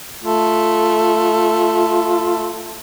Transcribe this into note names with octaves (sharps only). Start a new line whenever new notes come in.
A3 F4